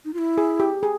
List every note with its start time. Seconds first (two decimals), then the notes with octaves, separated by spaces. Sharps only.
0.05 D#4
0.14 F4
0.18 E4
0.38 G#4
0.60 G4
0.83 G#4